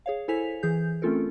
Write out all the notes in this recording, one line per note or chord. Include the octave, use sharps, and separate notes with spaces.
G#4 C#5 F5
E4 A4 C5 G#5 B6 F7
E3 G#4 G6
A3 C4 C#4 F4 A4 A#4